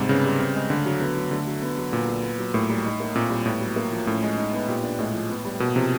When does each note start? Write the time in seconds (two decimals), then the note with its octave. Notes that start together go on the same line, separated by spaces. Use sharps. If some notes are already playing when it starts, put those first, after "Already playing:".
Already playing: G#2 C3 G3
0.09 C#3 B3
0.25 G3
0.39 C4
0.55 G#3
0.70 D3 A3
0.86 F#3
1.01 B3
1.16 F#3
1.31 D3 A3
1.47 F#3
1.62 B3
1.77 F#3
1.92 A#2 B3
2.08 F#3
2.23 B3
2.38 F#3
2.54 A2 A#3
2.69 G3
2.84 D#4
3.00 A#3
3.15 A#2 C4
3.30 G3
3.46 A2 B3
3.61 F#3
3.76 A#3
3.92 F3
4.07 A2 C#4
4.22 G#3
4.38 D#4
4.53 B3
4.68 A#2 G4
4.83 D4
4.99 A2 G#3
5.14 F3
5.29 B3
5.45 G3
5.60 B2 A#3
5.76 C3 F3